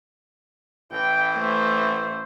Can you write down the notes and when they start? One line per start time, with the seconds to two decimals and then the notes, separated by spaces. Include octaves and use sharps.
0.92 A1 E3 G5
1.37 A3 C5